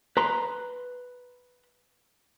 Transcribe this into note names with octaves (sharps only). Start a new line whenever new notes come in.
B4 A#5 C6